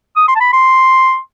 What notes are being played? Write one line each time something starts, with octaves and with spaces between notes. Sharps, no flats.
D#6
C6
A5
B5
C6